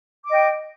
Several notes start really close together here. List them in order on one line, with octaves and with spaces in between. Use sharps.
D6 D#5 G5